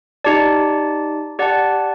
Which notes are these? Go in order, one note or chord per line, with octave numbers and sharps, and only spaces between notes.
D#4 G4 D5 A5
G4 D5 F#5 A5